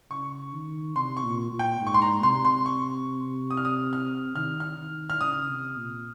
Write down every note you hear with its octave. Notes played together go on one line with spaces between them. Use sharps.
C#3 C#6
D#3
C3 C6
C#6
A#2
A#2
G5
G#2
C#6
C6
A#5
C3 C6
C6
C#6
D#6
F6
D#6
F6
D#3 F6
F6
D#3
F6
C#3 D#6
C3
A#2